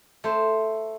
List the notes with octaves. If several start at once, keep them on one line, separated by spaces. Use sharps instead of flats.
A3 C5